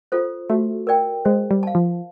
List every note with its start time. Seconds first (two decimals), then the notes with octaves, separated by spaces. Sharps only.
0.12 F4 A4 C5
0.49 A3 F#4
0.87 A#4 D5 G5
1.25 G#3 C5
1.51 G3
1.63 F5 A5
1.75 F3